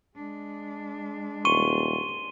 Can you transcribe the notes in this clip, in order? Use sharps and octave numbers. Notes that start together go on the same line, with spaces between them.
G#3 D4
D#1 C6 C#6 D#7 G7